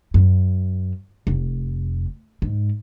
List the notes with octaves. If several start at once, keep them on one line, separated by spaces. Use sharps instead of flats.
F#2
F1
G#2